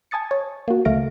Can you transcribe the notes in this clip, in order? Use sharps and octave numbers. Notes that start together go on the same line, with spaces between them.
G#5 A5 D#6 A6 C#7
C#5
A#3 F#4
C#2 A3 F5 A#6 D7